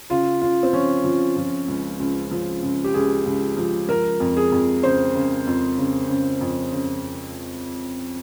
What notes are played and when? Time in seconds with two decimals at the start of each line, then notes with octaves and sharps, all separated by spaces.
0.10 C#3 F4
0.41 C#3 F4
0.63 C4
0.73 F3 C#4
1.04 F3
1.36 F3
1.68 C#2
2.00 C#2
2.31 F3
2.63 C#2
2.84 G4
2.94 C#2 G#4
3.26 C#2
3.57 F3
3.89 F3 A#4
4.20 F2
4.37 G#4
4.52 F2
4.83 C#3 C5
5.15 C#3
5.47 F2
5.78 C#3
6.09 C#3
6.41 F2
6.72 C#3